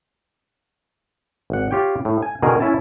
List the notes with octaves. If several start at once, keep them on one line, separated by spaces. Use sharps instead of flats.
G#1 F#5
F4 G4 C#5 G5
A2
G#5
B2 D3 D#3 G#4 A#4
C#4 E4 G#5 A5